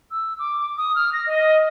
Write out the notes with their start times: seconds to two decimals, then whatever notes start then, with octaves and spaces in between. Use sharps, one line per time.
0.11 E6
0.39 D6
0.78 D#6
0.96 F6
1.13 A#6
1.27 D#5